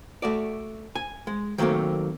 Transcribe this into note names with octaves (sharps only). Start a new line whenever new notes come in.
A3 F#4 D5
G#5
G#3
D#3 F#3 A3 A#3 C4